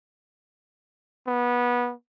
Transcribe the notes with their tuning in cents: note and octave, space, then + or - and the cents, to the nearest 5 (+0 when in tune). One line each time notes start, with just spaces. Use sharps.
B3 -20